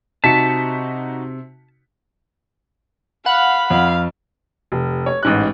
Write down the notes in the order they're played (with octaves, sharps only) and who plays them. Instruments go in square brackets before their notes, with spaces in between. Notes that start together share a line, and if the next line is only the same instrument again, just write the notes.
[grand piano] C3 [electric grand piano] D#4 F#4 C#7 [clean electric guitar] A5 [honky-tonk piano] B6
[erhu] F5 [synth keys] F#5 [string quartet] B5
[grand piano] F2 [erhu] F5
[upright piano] F1
C#5
A1 G#2 F#6